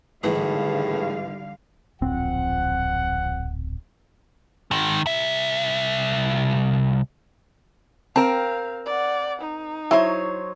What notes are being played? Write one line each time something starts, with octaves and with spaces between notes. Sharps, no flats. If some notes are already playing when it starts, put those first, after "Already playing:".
G#1 A2 D3 E3 G3 G#4 F5
D1 A#1 F3 C4 F#5
D#3 G#3
C2 E5
C4 A#4 F5 A5
D5 F#5
D#4
F#3 E4 C5 C#5